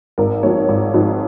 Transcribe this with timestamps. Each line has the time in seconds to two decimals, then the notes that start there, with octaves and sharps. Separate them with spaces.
0.18 G#1 A#4
0.43 G#2 F3 C#5
0.69 G#1 C#5
0.94 G#2 F3